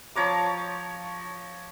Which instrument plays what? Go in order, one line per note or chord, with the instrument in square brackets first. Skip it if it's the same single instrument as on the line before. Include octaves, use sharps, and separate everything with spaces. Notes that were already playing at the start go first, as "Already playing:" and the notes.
[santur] F3 C#5 A#5 D6